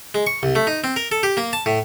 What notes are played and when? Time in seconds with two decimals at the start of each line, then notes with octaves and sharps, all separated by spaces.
0.15 G#3
0.27 C#6
0.43 C2
0.55 A3
0.67 D#4
0.84 C4
0.96 A#4
1.12 A4
1.23 G4
1.37 A#3
1.53 A5
1.66 A2